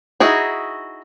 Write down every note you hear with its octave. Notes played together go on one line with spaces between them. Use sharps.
D#4 E4 F#4 G#4